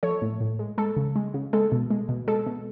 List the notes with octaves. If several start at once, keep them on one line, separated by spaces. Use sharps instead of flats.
F3 A4 C#5
A2
A2
G#3
G#3 A4
C#3
G#3
C#3
G#3 A4
B2
G#3
B2
G#3 A4
B2